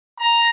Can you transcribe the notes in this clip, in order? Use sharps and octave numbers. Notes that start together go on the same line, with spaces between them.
A#5